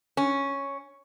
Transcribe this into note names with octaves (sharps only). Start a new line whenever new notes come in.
C#4